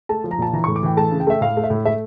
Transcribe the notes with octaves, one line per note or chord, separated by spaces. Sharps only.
A3 A5
F3
A#5
A#2 A5
E3 A#5
A2 C#6
D6
E3 G5
A3 A5
C#3
G5
A3 E5
A2 F5
A3
E5
A2
A3 E5